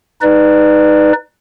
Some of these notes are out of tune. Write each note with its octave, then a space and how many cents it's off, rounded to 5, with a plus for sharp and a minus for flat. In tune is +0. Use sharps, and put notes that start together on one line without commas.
D#4 +0 B4 +0 D5 +30